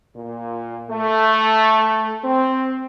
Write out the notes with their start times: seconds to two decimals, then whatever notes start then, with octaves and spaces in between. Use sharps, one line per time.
0.16 A#2
0.91 A3
2.25 C4